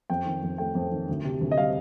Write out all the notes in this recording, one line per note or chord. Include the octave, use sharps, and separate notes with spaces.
F2 G5
D#3
F2
A3 G5
F2
D#3
D2
C3
D2
D#5
G3 F5